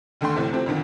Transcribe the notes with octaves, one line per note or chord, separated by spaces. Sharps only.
D#2 D3 A3 G5 C6
E2 A2 C3 A3
C3 F3 A3 C4
F2 A#2 D3 D#3